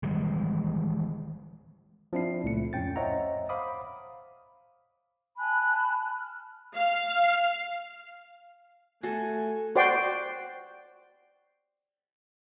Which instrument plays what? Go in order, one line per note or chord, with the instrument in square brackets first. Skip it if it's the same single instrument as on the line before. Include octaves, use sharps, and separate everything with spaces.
[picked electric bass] D#3 E3 G3 G#3
[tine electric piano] F3 C4 D4 E4 C7
C#2 A#2 A3 C#7
F2 A2 C#4 G5 A6
C5 C#5 D#5 E5 F#5 A#5
C5 F5 B5 D6 D#6
[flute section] G#5 A5 B5 F#6
F6
[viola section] F5
[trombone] A3 [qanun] F#4 A4 [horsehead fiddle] G#5
[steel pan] F#4 C5 D5 G5 C6